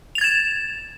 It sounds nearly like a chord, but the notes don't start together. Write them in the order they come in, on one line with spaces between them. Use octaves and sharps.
F7 A6 G#6 E7